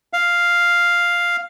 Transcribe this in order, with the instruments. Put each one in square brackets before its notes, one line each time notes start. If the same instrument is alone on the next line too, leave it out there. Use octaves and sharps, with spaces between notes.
[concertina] F5